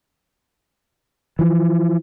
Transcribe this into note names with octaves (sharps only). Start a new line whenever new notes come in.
E3 F3